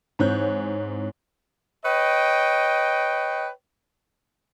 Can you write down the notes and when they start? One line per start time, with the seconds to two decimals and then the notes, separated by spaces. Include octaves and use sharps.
0.19 G#2 E3 C4 C#5 F#6 G6
1.85 B4 C#5 D#5 G5